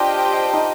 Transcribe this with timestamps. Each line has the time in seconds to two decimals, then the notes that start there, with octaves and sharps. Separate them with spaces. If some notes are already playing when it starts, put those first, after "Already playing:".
Already playing: D4 F4 G4 C5 D#5 G5
0.53 D#4